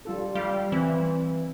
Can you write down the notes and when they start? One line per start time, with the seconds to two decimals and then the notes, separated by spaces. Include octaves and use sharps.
0.05 G3 F4 A4
0.35 G3 F5
0.72 E3 C4